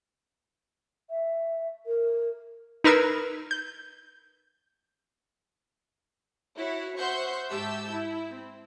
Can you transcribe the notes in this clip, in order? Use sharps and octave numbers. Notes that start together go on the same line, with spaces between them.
E5
A#4
D#4 A#4 B4 E6 G#6 C7
G6
E4 F#4 C#5
C5 E5 F#5 C6 C#6 G6
G#2 G4 E5 A5 E6 G6
E4
C4